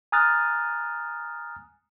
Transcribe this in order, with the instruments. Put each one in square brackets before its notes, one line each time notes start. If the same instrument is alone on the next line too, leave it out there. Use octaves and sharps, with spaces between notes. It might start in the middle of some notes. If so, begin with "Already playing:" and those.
[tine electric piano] G#5 A#5 D#6 F6 F#6 A6